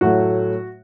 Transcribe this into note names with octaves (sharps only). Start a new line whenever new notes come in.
A2 F#3 A3 F#4